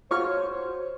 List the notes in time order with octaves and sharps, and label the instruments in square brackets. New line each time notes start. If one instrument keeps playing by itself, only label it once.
[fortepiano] F4 C#6 F6 [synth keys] F#4 C#5 [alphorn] C5